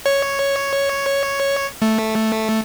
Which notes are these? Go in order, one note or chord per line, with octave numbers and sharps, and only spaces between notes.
C#5
A3